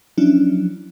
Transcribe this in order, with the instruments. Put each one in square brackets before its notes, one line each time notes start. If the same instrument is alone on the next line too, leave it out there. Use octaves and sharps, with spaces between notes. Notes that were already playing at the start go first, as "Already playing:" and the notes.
[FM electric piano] F3 F#3 C#4 D4 E4